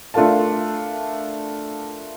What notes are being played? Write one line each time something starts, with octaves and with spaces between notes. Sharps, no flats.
A3 D4 F4 A#4 F5 A5